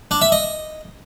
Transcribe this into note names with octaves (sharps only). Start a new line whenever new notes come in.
D4
E5
D#5